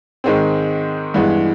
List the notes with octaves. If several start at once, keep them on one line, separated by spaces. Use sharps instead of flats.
G#2 D#3 G#3 C4
G2 E3 G#3 B3